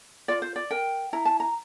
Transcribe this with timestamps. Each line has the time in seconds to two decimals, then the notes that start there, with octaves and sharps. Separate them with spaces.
0.28 F4 D5
0.42 C5
0.56 D5
0.71 A#4 G5
1.13 E4 A#5
1.25 A5
1.40 A#5